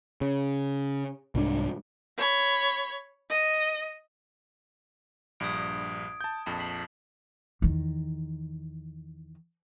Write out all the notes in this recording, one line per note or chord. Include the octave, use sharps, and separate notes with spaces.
C#3
C2 G#2 C#4 D4
C#5 B5
D#5
A#1 G2 D#6 G#6 D7
A5 G6
A#1 F2 A5
B6 C7 F#7
E2 D#3